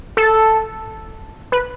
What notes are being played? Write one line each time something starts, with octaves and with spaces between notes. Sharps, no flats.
A4
B4